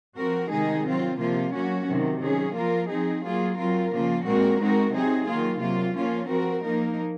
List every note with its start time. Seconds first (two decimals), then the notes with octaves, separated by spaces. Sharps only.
0.17 F3 C4 F#4 A#4
0.51 C3 D#3 G#3 D#4 G#4
0.85 F#3 C4 F4
1.19 C3 F3 A#3 F4
1.53 F#3 A#3 C#4 F#4
1.87 C3 D#3 F#3
2.22 D#3 F#3 C#4 G#4
2.56 F3 A#3 F4 A#4
2.90 F3 C4 D#4 G#4
3.24 F#3 A#3 F4 G#4
3.57 F#3 C4 F4 A#4
3.92 C#3 F3 A#3 F4
4.26 A#2 G#3 C4 F#4 A#4
4.60 G#3 C4 D#4 F#4 A#4
4.94 C3 F#3 C4 D#4 G#4
5.28 D#3 F#3 A#3 F4
5.61 C3 F#3 A#3 F4
5.95 F3 A#3 C#4 F4
6.29 F3 C4 F#4 A#4
6.64 F3 A#3 D#4 A#4